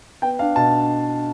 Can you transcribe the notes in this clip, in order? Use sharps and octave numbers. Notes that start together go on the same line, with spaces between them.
B3 G5
D4 F5
B2 A5